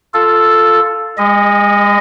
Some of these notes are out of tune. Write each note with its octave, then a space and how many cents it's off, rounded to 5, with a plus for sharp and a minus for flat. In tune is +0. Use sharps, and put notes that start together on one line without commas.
F4 +0 A4 +0
G#3 -35 D#5 +0